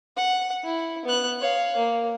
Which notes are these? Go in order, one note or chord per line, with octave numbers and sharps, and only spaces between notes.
F#5
E4
B3 F#6
C#5 F5
A#3